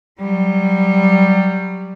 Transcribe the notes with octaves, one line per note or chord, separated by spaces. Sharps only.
F#3 G3